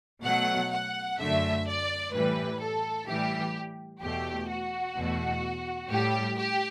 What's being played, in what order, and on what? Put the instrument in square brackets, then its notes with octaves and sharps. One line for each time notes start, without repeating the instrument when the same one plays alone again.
[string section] B2 F#3 A3 F#5
F#5
F#2 D3 A3 E5
D5
A2 E3 G3 B4
A4
A2 E3 G3 G4
E2 B2 A3 G4
F#4
E2 B2 A3
A2 G3 G4
G4